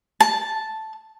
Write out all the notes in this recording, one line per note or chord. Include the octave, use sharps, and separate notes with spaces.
A5